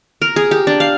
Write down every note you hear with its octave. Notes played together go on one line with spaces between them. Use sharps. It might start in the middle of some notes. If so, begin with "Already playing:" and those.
A#4
G#4
G4
D4
F5